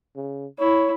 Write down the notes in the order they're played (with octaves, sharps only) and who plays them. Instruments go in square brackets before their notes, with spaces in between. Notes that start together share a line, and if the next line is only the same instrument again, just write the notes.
[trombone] C#3
[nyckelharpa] E4 [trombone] C#5